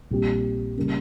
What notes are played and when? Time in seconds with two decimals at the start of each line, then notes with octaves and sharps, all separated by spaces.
0.11 A#1 A#2 G3 C4 G4
0.77 C#3 G3 A#3